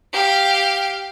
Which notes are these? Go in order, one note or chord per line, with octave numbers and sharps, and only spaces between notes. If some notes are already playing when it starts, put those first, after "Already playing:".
G4 F5